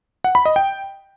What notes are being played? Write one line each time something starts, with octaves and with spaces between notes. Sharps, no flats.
F#5
B5
D#5
G5